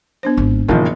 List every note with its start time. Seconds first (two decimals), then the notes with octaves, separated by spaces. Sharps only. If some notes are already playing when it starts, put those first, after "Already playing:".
0.23 B3 D4 C5
0.37 G#1
0.68 F#1 F2 A#2 D#3 F3